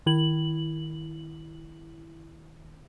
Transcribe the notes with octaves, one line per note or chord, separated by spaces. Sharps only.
D#3 E4 F#7